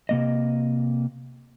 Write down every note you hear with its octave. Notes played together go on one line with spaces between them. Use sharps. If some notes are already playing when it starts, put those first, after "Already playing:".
C3 A#3 D#5